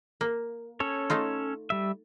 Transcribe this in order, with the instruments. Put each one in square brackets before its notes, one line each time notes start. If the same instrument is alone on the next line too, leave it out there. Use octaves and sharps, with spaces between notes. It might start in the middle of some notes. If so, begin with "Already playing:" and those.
[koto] A#3
[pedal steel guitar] C#4 A4 C#5
[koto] A3 D#4 F4
[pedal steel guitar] G3 E5